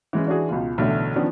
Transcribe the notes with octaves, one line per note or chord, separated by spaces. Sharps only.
E3 G#3 C#4
E3 D4 F#4 G#4
C#2 B2 F4
B1 A2 D3 E3 A3
D#3 F3 B3 C#4 D4